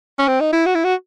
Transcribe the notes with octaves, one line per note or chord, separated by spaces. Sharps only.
C#4
C4
D#4
E4
F#4
E4
F#4